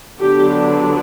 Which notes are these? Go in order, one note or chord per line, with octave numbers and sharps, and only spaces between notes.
D3 F#3 B3 D4 G4